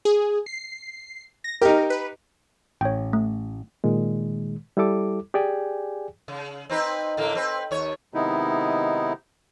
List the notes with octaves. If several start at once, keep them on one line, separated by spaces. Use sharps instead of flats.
G#4
C7
A#6
D#4 G4 A#4
B4
A1 C#5 G5
A3
A#2 D#3 G#3
G3 E4 G4 A4 D6
G4 G#4 D5 G5 G#5
C#3
C4 D#4 B4
A2 D3 A#3
C4 B4
D#2 C#5
C3 D#3 G#3 B3 D#4 E4